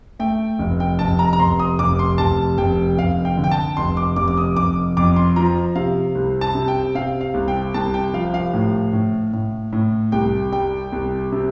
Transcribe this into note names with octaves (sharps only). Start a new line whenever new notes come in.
A3 G5
F1
G5
F1 A5
A#5
A#5
F1 C6
D#6
F1 D6
C6
F1 A5
F1 G5
F1 F5
G5
D3
G5
A5
F1 C6
D6
F1 D6
D6
D#6
F1 D6
F2 D6
C6
F3 A#5
C3 F5
C2
A5
C3
G5
C3 F5
F5
C2
G5
C2 A5
G5
F3 F5
F5
A2
A2
A2
A2
C2 G5
G3 G5
C2
C3